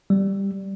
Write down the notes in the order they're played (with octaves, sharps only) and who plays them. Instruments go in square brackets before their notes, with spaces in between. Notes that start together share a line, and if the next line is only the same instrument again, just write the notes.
[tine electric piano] G3